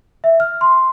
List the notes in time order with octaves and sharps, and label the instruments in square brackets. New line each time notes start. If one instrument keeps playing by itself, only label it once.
[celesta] E5
F6
C6